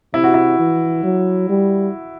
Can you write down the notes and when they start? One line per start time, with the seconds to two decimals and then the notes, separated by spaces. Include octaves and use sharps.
0.14 C3 E4
0.24 F#4
0.34 E4
0.59 E3
1.04 F#3
1.50 G3